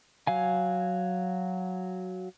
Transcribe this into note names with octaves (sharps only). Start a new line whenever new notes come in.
F#3 F5 G#5